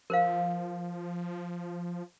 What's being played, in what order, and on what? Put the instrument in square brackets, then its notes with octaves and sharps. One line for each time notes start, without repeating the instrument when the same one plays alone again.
[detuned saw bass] F3 [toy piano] A#4 C5 F5